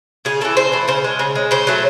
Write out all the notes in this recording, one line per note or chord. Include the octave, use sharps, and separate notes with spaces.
C#3 G#4
E3 A3 A4
C#3 C5
E3 A3
C#3 C5
G#3
C#3
G#3
C#3 C5
F#3 A3